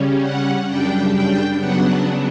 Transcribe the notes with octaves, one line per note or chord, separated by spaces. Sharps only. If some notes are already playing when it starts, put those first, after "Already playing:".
Already playing: C#3 G3 C#4
F#5
F#2 C#3 G3 D4 G5
G5
C#3 F#3 B3 D4 F#5